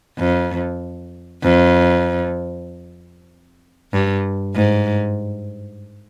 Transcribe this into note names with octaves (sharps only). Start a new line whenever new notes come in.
F2
F2
G2
G#2